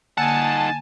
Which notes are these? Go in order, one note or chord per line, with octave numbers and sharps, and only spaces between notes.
D3 A#3 D#4 F#5 G#5 A5 E6